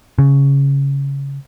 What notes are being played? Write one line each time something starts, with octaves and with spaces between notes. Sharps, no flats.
C#3